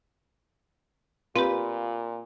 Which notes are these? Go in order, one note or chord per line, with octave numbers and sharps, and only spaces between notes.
A#2 C4 F4 G4 B4